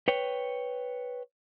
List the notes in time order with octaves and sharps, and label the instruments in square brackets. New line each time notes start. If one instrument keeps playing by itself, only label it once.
[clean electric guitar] B4 C#5 G5